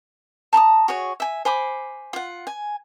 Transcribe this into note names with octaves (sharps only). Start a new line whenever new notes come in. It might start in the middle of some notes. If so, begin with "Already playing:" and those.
A5 A#5 C#6 D#6
F#4 G#4 C#5
E5 G#5
C5 G#5 B5 D6
F4 F#5
G#5